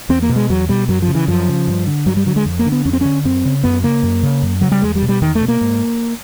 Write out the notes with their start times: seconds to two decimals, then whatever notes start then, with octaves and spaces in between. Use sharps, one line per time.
0.09 E2 C4
0.22 A#3
0.29 B2
0.36 G#3
0.50 E2 F#3
0.69 B2 G3
0.88 F#2 F#3
1.02 F3
1.08 C#3
1.15 E3
1.28 F#2 F3
1.48 C#3
1.68 G2
1.87 D3
2.06 G2 F#3
2.17 G3
2.26 D3 F#3
2.36 G#3
2.46 F2
2.59 A#3
2.66 D3
2.72 B3
2.85 F2 C#4
2.93 C4
3.01 D3 C#4
3.25 F#2 C4
3.45 C#3
3.64 F#2 B3
3.83 C#3 A#3
4.03 F#2
4.23 C#3
4.43 F#2
4.61 C#3 F#3
4.72 G3
4.82 E2 G#3
4.95 G3
5.02 B2
5.09 G3
5.22 E2 D#3
5.35 A3
5.41 B2
5.48 A#3
5.61 G#2